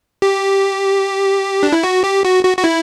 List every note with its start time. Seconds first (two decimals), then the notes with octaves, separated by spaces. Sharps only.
0.22 G4
1.63 D4
1.72 E4
1.83 F#4
2.04 G4
2.25 F#4
2.44 F#4
2.57 F#4
2.64 E4